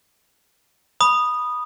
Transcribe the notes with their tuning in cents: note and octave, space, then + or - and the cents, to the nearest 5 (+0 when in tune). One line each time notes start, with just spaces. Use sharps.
B5 -10 D#6 -10